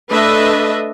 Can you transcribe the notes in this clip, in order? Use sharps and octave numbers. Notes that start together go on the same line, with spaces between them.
A3 D4 B4 D#5 E5